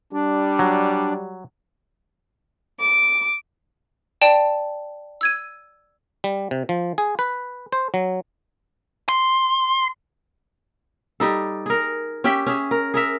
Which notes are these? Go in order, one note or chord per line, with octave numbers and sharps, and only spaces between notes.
G3 D4
F#3
D6
D5 G5 A5
E6 G#6 D#7
G3
C3
F3
G#4
B4
C5
F#3
C6
G3 D#4 A4
G#4 A#4
C#4 G4 E5 G5
C#4 G#4 E5
A#4
G#4 A#4 E5